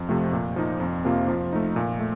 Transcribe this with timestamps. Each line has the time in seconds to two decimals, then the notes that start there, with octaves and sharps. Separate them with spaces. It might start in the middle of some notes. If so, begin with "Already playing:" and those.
Already playing: F2
0.09 C3 F3 A3
0.33 A#2
0.56 F3 A#3 D#4
0.80 F2
1.05 C3 F3 A#3 F4
1.28 F3
1.53 A3 D#4
1.76 A#2
2.00 A3